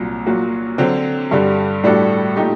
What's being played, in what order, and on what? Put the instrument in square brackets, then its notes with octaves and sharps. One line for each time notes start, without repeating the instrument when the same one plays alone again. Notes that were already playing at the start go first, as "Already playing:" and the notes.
Already playing: [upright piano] C2 A#2 F#3
A#2 F#3 A#3 F#4
D3 F#3 C4
G2 D3 G3
A2 G3 D4 F#4 A4
A#2 A3 D#4 G4